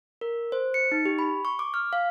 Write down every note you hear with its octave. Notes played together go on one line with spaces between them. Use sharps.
A#4
C5
C#7
D#4
G4
B5
C#6
D6
F6
F5